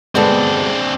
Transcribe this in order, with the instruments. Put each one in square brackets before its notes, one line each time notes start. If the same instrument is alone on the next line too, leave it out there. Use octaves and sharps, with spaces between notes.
[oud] D2 G2 B3 [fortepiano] G3 A4 [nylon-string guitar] G#3 [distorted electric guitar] C4 D4